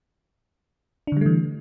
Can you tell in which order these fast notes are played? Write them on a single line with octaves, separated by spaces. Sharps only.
D4 D3 G3 A3 E3